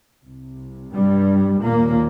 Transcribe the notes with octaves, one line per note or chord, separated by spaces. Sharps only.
C2 C3
G2 G3
D#2 A#2 A#3